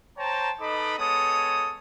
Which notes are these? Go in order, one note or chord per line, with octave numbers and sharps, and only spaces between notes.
C5 C#5 G5 A5 A#5
D#4 A4 B4 D#5 B5 D6
G#3 B3 A4 C#5 D#6